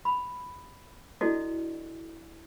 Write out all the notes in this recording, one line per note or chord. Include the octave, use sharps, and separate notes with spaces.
B5
D4 E4 F#4 A4 D5 D#5